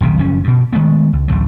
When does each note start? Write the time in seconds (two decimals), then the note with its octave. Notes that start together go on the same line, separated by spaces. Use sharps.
0.01 D#1 B1 C3 D#3
0.18 F#1 F3 C#4
0.44 G2 B2
0.73 D#3 G#3 A3 B3
1.13 C#2
1.28 A1 D2 A2 F#3